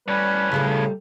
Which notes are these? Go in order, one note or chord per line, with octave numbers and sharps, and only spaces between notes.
A2 G3 C#4 B4
A#2 C#3 G3 A3